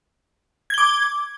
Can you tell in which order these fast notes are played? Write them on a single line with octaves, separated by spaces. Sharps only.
G#6 G7 D6